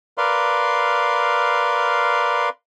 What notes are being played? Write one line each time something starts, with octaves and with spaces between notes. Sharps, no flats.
A#4 B4 D5 F5 C6